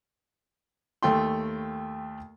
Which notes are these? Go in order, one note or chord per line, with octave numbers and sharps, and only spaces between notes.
D#2 A3 G5 C6